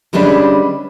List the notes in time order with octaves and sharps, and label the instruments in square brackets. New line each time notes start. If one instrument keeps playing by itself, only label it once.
[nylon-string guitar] D3 G3 G#3 C#4 D4 B4